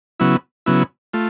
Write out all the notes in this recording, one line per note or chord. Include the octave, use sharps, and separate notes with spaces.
C#3 F#3 B3 E4
C#3 F#3 B3 E4
A3 F4